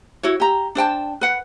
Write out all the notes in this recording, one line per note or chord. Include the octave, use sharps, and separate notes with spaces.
E4 F#4 C#5
G4 A#5
D4 C5 G5 A5
B4 F#5